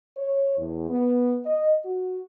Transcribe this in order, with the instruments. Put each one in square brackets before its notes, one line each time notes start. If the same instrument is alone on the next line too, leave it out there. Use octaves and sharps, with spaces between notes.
[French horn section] C#5
E2
B3
D#5
F#4